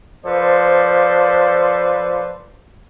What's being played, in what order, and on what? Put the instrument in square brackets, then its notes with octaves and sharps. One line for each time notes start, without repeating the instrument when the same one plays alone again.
[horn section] F3 A4 B4 C5 D5